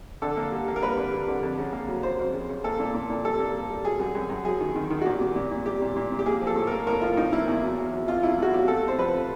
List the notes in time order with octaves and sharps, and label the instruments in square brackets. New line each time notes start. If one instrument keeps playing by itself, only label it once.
[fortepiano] D3 A4
A#3
G3
A#3
A#4
G3 B4
D3
G3
D3
F2
C#3
A#3
F#3
F#3 C5
F2
C#3
C#3
A#3 A4
A#2
A#2
A#2
G3 A4
A#3
G3
G3
F#3 G#4
F#2
F#2
F#2
F#3 G#4
D#3
D#3
D#3
F#4
A#2 G4
A#2
A#2
A#2
G3 G4
A#2
A#2
A#2
G4
A#3 G#4
F3
A4
A2
A#4
A#3
A2 A#4
A2 F4
A2 D#4
A#3 E4
E2
F#3
E2
F#3
B2 F4
E2 E4
A3 F#4
F#3 G4
A3 A4
C3 C5
F3 B4
C3